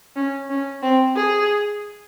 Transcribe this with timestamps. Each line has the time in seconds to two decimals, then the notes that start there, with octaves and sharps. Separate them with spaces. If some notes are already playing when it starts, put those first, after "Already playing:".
0.16 C#4
0.50 C#4
0.83 C4
1.16 G#4